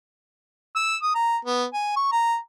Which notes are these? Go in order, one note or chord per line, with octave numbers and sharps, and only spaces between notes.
E6
D#6
A#5
B3
G#5
C#6
A#5